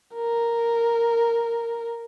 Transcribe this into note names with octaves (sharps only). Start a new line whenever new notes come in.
A#4